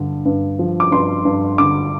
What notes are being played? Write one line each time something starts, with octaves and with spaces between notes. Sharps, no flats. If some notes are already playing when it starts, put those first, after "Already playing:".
Already playing: G2 D3
G2
F3
D6
G2 C6
G2
D3 D6